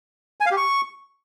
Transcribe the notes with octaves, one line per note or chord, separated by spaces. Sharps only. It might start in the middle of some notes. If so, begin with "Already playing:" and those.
G#5
F5
G4
C#6